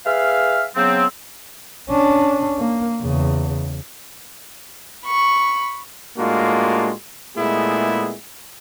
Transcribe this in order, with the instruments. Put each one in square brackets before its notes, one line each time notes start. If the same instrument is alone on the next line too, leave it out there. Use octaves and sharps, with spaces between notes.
[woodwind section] G#4 B4 E5 F5
C#3 F#3 B3 C4
[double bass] C#4 D4
A#3
E2 C#3
[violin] B5 C#6
[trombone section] A2 G#3 A#3 D4 F4 F#4
A#2 G#3 A3 B3 E4 G#4